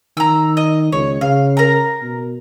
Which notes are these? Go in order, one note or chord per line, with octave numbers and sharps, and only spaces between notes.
D#3 A#5 E6
D#5
C#2 C#5
C#3 F5
A#4 A#5
B2